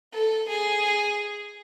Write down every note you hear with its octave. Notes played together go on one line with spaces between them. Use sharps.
A4
G#4